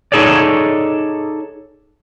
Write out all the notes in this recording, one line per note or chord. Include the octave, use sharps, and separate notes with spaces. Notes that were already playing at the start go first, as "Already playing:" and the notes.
D#4 G#4 A4 C#5 D5